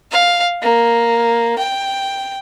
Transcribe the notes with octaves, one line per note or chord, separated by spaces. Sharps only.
F5
A#3
G5